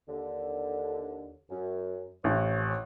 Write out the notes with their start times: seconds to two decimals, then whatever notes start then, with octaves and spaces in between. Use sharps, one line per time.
0.07 D#2 D3
1.50 F#2
2.24 A1 F2 C#4 C#5